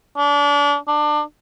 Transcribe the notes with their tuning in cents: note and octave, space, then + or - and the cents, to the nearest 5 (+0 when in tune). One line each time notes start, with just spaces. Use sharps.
D4 -30
D4 +25